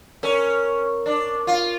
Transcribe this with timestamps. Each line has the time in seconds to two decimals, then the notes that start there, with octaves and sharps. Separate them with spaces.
0.23 C#4 A#4
1.06 D4
1.47 F4